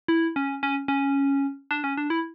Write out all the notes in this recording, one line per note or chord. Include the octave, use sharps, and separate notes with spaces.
E4
C#4
C#4
C#4
D4
C#4
D4
E4